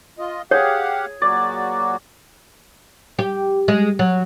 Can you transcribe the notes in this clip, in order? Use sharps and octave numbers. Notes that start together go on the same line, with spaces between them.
F4 D#5
G4 G#4 C#5 F5 F#5
A#2 F#3 F#4 D5
G4
G#3
F#3